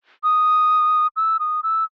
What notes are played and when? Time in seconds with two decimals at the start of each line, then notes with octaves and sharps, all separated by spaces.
0.24 D#6
1.17 E6
1.40 D#6
1.63 E6